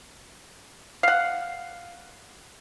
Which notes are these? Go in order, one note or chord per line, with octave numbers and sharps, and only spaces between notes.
F5 F#5